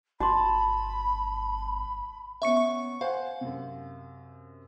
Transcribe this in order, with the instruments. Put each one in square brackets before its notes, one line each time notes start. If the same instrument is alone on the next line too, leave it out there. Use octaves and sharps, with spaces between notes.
[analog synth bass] G1 [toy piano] F#4 C6 [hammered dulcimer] A5 [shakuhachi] B5
[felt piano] B3 C#4 [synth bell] E5 C#6 C#7
[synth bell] C#6
[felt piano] C5 F#5 G#5 [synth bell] F5
[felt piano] F#2 C3